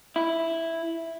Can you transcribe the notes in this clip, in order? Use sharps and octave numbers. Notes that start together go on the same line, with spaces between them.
E4